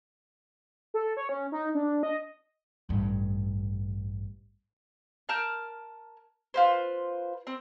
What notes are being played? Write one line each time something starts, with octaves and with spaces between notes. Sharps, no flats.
A4
C#5
C#4
D#4
D4
D#5
A1 G2
A#4 A5 F6 G6
F4 B4 C5
C4